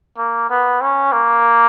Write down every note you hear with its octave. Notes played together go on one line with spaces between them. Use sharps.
A#3
B3
C#4
A#3